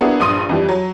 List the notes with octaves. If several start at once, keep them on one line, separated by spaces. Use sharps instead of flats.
A#3 B3 D4 E4 F#4 G#4
A#1 G2 C6 D#6 D#7
F2 E3 G3
F#3